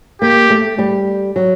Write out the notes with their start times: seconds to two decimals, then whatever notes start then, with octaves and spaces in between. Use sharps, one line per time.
0.21 A#3 G4
0.50 A3
0.79 G3
1.36 F#3